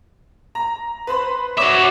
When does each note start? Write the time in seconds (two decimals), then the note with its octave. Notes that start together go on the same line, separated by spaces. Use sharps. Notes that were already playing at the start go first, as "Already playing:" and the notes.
0.55 A#5
1.07 B4 C5 B5
1.57 F#4 C#5 E5 D6